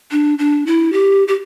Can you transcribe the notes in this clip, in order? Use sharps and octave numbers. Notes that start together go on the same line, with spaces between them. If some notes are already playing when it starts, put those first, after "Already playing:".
D4
D4
E4
G4
G4